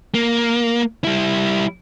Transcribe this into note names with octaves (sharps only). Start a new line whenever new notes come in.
A#3
G3 E4